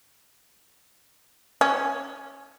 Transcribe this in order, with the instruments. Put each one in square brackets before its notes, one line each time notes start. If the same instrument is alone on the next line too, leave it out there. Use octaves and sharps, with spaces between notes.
[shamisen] C#4